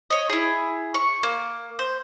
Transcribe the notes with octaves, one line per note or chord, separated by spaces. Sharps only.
C#5 D#5
E4 G#4
C#6
A#3
C5